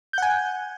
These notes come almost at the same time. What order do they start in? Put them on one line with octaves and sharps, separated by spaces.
G6 F#5 G#5